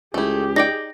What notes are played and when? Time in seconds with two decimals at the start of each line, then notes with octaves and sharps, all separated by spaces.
0.14 C#2 A3 E4 G4 G#4
0.56 D#4 D5 G5 A#6 D7